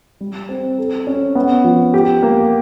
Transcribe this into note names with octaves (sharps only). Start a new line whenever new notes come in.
G3
C4
A4
C#4
B3
F3
G4
A#3